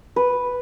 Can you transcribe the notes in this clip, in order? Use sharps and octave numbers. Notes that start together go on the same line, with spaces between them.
B4